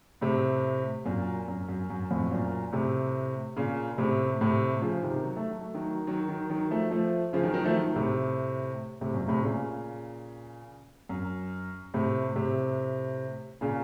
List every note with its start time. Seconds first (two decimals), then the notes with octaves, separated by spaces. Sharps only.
0.21 A2 C3
1.05 F#2 A#2
1.48 F#2
1.69 F#2
1.90 F#2
2.11 F2 A2
2.31 F#2 A#2
2.72 A2 C3
3.57 A#2 C#3
3.98 A2 C3
4.41 A2 C3
4.82 C#3 F3
5.03 C3 D#3
5.24 F#3
5.36 A3
5.49 F#3
5.61 A3
5.74 D#3 F#3
6.07 D#3 F#3
6.28 D#3 F#3
6.49 D#3 F#3
6.71 F3 A3
6.91 F3 A3
7.33 C#3 F3
7.43 D#3 F#3
7.54 D#3 F#3
7.65 F3 A3
7.75 D#3 F#3
7.96 A2 C3
9.01 A2 C3
9.14 F#2 A#2
9.28 A2 C3
9.42 A#2 C#3
11.09 F#2
11.94 A2 C3
12.36 A2 C3
13.61 A#2 C#3